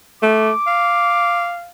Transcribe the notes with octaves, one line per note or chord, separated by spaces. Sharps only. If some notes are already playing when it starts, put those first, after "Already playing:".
A3 D6
F5